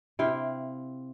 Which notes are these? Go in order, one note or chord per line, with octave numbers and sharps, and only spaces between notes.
C3 E4 F5 G5